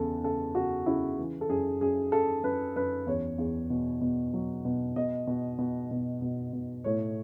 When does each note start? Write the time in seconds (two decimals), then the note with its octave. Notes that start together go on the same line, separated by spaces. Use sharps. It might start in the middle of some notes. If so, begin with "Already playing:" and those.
Already playing: E2 C#3 A4
0.23 C#3 A4
0.55 C#3 F#4
0.86 C#3 E4
1.18 E3
1.41 A4
1.49 F#2 G#4
1.81 F#2 G#4
2.12 F#2 A4
2.44 F#2 B4
2.76 F#2 B4
3.07 E2 C#5
3.38 E2
3.70 B2
4.01 B2
4.33 F#3
4.65 B2
4.96 B2 D#5
5.27 B2
5.58 B2
5.91 B2
6.22 B2
6.53 B2
6.84 A2 C#5